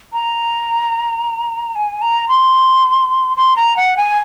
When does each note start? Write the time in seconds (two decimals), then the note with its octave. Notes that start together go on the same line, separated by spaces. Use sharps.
0.13 A#5
1.75 G#5
2.02 A#5
2.28 C6
3.37 C6
3.56 A#5
3.77 F#5
3.97 G#5